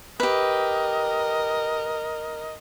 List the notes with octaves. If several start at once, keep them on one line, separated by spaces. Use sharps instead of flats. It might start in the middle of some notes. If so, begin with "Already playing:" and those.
G4 A#4 B4 D#5